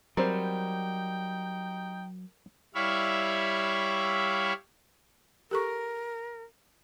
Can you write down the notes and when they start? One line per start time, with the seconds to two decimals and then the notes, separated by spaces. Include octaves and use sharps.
0.17 F#3 G3 C4 D#4 A#4 C5 G5
2.75 G3 E4 C#5 E5 F5
5.51 G4 A4 A#4 C#6